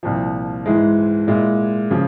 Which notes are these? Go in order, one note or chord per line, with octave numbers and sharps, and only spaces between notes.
C2 A#2 F3
G#2 E3 G#3 E4 G#4
A#2 G#3 E4
C#3 F3